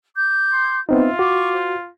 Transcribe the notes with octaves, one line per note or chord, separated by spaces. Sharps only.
D6 G6
C6
B3 C4 D#4 F4 E5
F#4 C#6 D6
C5